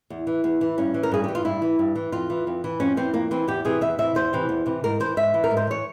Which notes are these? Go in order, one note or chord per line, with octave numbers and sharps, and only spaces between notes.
E2
E3
E2
E3
G2 C#4
E3
A#4
G2 G#4
E3 G4
F4
G2 E4
E3
G2
E3
F2 F4
E3
F2
E3
F2 C#4
E3 C4
F2 A#3
E3 C4
E2 G4
C3 E3 G#4
E2 E5
C3 E3 E5
E2 C5
C3 E3
E2
C3 E3
G#2 A#4
E3 C5
G#2 E5
E3
A#4
G#2
C5
E3 C#5